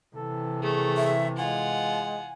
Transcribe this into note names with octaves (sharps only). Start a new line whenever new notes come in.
C3 E3 A4
A3 G#4 C#5
E5
G#3 F4 F#5 G#5